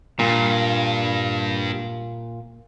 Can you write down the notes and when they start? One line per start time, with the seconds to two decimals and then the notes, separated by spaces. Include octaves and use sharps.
0.19 G2 A#2